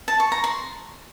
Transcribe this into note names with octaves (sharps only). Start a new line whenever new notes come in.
A5
C#6
A#5
C6